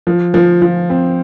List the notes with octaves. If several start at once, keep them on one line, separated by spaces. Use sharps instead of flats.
F3
F3
F3
C4